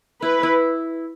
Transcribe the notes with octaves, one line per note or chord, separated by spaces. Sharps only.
E4 B4
E4